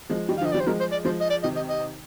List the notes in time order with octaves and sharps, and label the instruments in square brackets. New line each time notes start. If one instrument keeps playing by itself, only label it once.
[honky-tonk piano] F3 G#3
D#3 G3
[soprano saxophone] F5
[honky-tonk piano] D3 F3 [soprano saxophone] D#5
[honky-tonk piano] D#3 G3 [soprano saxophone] D5
[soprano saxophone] C5
[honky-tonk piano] F3 G#3 [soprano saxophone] A#4
[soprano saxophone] C5
D5
[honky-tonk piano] F3 G#3 [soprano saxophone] C5
[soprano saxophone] D#5
D5
[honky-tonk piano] C3 D#3 [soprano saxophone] D#5
[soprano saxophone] D#5
D#5